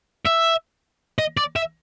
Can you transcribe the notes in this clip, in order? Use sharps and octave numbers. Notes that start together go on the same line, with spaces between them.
E5
D#5
D5
E5